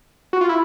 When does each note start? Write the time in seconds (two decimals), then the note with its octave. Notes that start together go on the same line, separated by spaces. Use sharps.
0.33 F#4
0.41 F4
0.49 E4